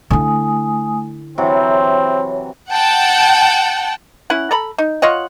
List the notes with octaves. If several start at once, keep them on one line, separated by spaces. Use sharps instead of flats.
D3 A3 E4 G#5 D#6
C3 E3 F#3 C4 C#5
F#5 G5 A5
C#4 E4 F#5
A4 A#5 B5
D#4
F4 C#5 D#5 F#5